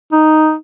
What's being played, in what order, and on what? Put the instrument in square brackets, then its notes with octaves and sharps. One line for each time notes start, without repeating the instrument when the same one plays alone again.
[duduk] D#4